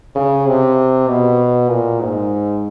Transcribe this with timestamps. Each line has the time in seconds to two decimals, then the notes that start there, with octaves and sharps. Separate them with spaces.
0.15 C#3
0.47 C3
1.08 B2
1.69 A#2
2.01 G#2